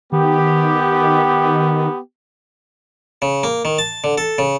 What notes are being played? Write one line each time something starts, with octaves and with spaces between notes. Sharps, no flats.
D#3 B3 G4
C#3
A#3
D#3
A5
D3
A4
C#3